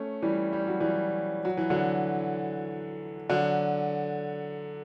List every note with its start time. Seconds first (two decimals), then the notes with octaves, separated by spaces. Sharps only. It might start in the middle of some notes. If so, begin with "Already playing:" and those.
Already playing: A3 C#4
0.22 E3 G3
0.53 G3
0.68 F#3
0.80 E3 G3
1.45 F#3
1.57 E3
1.70 D3 F#3
3.30 D3 F#3